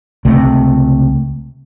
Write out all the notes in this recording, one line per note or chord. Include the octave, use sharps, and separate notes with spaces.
C#2 C3 A3